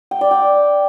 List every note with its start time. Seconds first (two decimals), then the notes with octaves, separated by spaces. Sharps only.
0.11 G5
0.21 D5
0.31 G5